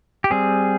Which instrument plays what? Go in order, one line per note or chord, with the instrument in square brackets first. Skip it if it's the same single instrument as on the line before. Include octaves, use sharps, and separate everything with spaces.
[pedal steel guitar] G4
G3 C4 G#4